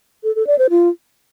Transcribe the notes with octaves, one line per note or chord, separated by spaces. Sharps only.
A4
A4
D5
C5
F4